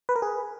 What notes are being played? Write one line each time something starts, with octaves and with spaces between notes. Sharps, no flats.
B4
A#4
G#4